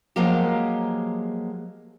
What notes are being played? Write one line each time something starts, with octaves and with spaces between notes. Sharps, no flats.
F3 F#3 G#3 A#3 G4